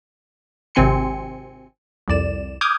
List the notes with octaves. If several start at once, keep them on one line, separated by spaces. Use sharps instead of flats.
G#1 C3 C4 G#5 C6 C#7
C2 F2 D5 E7
D6 D#6 F6 G6 G#6